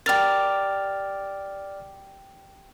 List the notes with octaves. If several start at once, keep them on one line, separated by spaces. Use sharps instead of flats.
G4 A#4 D5 F6 A6